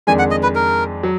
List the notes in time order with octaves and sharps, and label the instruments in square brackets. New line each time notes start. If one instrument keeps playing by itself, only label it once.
[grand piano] F2 D#3 G#3 D4 [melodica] G#5
[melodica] F#5
D#5
B4
A#4
[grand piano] F#3